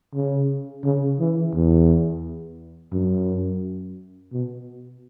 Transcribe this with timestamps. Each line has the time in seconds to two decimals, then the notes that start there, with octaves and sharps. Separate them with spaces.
0.15 C#3
0.85 C#3
1.20 E3
1.54 E2
2.93 F#2
4.32 B2